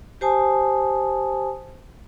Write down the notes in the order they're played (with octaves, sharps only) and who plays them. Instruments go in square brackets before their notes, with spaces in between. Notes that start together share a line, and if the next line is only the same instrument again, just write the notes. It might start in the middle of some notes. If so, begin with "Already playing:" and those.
[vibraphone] G4 C5 G#5 A5 D#6